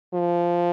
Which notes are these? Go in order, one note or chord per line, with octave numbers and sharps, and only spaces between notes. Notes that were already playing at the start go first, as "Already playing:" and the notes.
F3